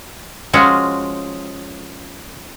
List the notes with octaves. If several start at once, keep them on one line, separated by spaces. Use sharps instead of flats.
F3 G#3 C#4 F#4